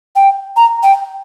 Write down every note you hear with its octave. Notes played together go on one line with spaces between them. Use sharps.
G5
A#5
G5